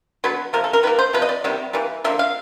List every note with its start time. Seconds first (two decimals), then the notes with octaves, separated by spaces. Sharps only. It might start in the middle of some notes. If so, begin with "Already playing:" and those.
0.24 D3 F#3 B3 B4
0.53 C3 F3 A#3 A#4
0.64 A4
0.73 A#4
0.83 D#3 G3 A#3 B4
0.99 C5
1.13 C3 F3 B4
1.22 D#5
1.29 D5
1.44 C3 D#3 G3 B3
1.73 E3 G3 A#3
2.04 D3 F3 A#3 E5
2.19 F5